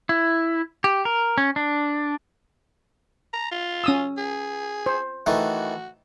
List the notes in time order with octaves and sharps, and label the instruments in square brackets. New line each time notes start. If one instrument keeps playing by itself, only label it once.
[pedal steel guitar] E4
G4
A#4
C#4
D4
[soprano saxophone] A#5
F4
[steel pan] C#4 D#6 E6
[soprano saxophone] G#4
[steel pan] C5
[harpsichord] D#3 E3 A3 [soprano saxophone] F#4